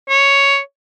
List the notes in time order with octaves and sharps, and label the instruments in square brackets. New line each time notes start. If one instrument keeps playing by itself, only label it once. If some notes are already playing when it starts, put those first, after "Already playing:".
[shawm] C#5